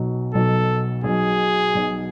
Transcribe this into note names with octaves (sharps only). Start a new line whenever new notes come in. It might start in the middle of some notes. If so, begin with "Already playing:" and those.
Already playing: B1 B2 F#3
B1 B2 F#3 A4
B1 B2 F#3 G#4
B1 B2 F#3